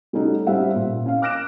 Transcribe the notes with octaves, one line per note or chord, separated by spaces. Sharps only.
G3 A3 C#4 D#4 F#4 A4
G3 C#4 C5 E5 F#5
A#2
C#4 F5
D6 F6 F#6 A#6 D7 E7